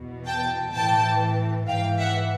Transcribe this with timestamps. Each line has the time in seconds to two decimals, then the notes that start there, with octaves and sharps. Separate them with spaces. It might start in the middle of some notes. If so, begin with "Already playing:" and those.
Already playing: E2 B2
0.27 G5 A5
0.74 A2 E3 G5 A5
1.67 G#2 E3 F5 G5
1.99 E5 F#5